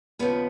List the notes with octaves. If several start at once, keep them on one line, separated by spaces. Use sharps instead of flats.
D#2 C#3 F3 B3